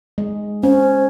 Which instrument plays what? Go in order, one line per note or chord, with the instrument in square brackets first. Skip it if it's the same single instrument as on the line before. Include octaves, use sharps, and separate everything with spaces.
[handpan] G#3
[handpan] C#4 [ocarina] C5